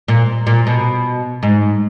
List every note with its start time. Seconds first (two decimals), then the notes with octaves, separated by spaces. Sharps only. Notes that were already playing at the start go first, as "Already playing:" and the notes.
0.08 A#2
0.47 A#2
0.67 B2
1.43 G#2